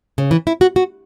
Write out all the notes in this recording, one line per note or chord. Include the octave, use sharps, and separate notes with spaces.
C#3
E3
E4
F#4
F#4